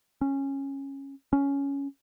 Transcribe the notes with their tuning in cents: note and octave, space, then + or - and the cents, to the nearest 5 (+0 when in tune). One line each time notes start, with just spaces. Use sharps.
C#4 -15
C#4 +10